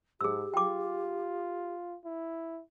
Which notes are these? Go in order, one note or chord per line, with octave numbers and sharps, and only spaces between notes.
G#2 G4 G#4 E6
F4 G5 D6
E4